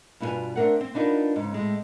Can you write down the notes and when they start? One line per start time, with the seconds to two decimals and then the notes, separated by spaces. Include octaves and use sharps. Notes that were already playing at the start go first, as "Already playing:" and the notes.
0.20 G2 B2 E4 F4 B4 G#5
0.55 A3 C4 D4 A#4 C5 F#5
0.81 C4
0.94 B3 D4 D#4 F4 A#4 B4
1.36 G#2 C#3
1.52 A2 G#3 C4